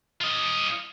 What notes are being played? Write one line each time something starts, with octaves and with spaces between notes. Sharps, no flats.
F4 D#5